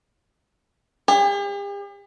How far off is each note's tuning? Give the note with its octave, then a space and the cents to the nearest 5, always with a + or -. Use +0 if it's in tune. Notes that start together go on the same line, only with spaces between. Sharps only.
G4 +45 C#5 +0